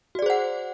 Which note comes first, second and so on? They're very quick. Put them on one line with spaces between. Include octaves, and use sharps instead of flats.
F#4 D5 G#4 C5 F#5